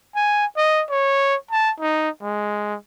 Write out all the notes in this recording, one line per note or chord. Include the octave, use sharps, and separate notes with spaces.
G#5
D#5
C#5
A5
D#4
G#3